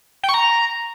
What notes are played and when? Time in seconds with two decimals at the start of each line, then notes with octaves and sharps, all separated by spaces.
0.23 G5
0.29 C#6
0.34 A#5